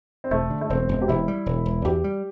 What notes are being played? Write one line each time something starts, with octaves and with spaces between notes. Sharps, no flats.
C4
E1 A3
D3
A3
E1 C4
E1
G4
E1 E4
G3
E1
E1
E2 G4
G3